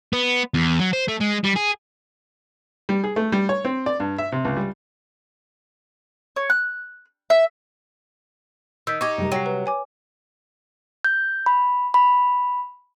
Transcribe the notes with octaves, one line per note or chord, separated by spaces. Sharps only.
B3
E2
F#3
C5
A3
G#3
G3
G#4
G3
G#4
A3
G3
C#5
C4
D5
G2
E5
C3
C#2
G3
C#5
F#6
E5
D#3 E6 G6 B6
D#4 G4 C#6 D6 G#6
C3 G3 A#4
F#3 G5 A#6 C7
B4
C#5 G#5 D6
G6
B5
B5